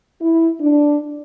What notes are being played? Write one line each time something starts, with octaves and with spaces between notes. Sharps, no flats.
E4
D4